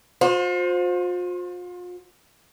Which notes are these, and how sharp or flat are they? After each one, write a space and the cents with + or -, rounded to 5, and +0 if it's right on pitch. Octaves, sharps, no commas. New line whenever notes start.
F4 +40 C5 +0